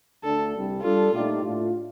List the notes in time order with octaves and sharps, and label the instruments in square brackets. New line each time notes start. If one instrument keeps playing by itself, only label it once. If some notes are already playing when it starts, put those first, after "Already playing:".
[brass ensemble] D2 D3 A3 D4 [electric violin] A4
[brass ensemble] C2 C3 G3
[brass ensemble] G3 D4 A4 [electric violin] F4
[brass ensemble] A#2 A3 D#4 G4 D5
A2 A3 D4 F4